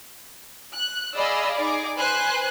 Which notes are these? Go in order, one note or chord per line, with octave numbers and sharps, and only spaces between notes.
F#6
G#4 D5 D#5 F5 B5 E6
D#4 G#4 D5 D6
B4 C5 G#5 F#6